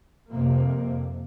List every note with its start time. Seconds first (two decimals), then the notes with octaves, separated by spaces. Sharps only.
0.31 F2 C3 A#3